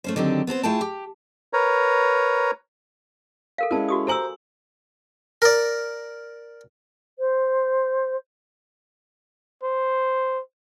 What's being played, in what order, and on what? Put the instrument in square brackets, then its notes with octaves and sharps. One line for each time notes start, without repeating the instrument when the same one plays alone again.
[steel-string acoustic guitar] A3 C#4 C5
D3 D#3 F#3 C4 G4
B3 C4 A4 C5
A3 E4 F4 G#4 G5 A5
G4
[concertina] A#4 B4 C#5 A#5
[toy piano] A4 A#4 F5
[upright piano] G#3 C#4 E4 [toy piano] A#4 A5
[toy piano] F#4 G4 D#6
[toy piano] A4 G#5 E6 [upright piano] C5 A#5 F#7
[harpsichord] A#4 D5
[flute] C5
[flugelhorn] C5